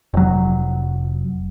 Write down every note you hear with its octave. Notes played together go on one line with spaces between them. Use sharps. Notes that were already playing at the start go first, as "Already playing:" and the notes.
F1 F#3